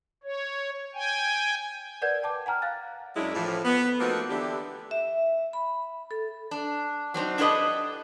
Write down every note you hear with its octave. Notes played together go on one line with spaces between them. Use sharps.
C#5
G5 G#5
A#4 B4 D5 F#5 G6 G#6
G5 A5 D6
F#5 G#5 A#5 F6
F5 F#6 A6
F#2 F#3 G#3 D4 E4
A2 E3 F3
B3
F3 A3 A#3 C4 D#4 F#4
D3 E3 D4 E4 G4
E5
B5
A4
D4
F#3 C4 D4 D#4
D4 E4 G4 A4 B4 D#5